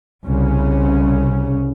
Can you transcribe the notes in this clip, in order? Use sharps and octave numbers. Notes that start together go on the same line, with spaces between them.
C2 C#3 C#4